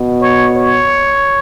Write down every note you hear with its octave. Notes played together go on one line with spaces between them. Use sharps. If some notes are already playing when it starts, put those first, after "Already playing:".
Already playing: B2
C#5
C#5